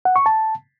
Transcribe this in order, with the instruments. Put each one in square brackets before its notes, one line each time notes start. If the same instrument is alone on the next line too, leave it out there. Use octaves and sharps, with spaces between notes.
[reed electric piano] F#5
C#6
A5